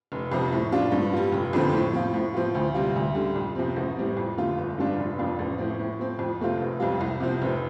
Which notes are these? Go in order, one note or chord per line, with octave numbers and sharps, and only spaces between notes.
F1
F2 C3 F3
A2
F3 D4 F4
G2
G3 F4
F1
F2 D3 F3 C4
A2
F3 C4 F4
A2
F3 C4 F4
D2
C3 G3 F4
D2
D3 G3
F2
C3 F3 C4
A1
A2 G3 C4
F2
D3 A3 F4
G1
G2 F3 D4 F4
F1
F2 F3 D4 F4
A1
A2 F3 C4
A2
F3 C4
F2
C3 A3 C4 F4
F1
F2 C3 G3 F4
C2
C3 F3 C4
F1